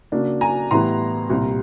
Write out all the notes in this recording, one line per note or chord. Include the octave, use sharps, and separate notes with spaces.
C#3 F#3 A#3 D4
G#5 A#5
A2 E3 G3 B3 A#5 C6
C2 A#2 G3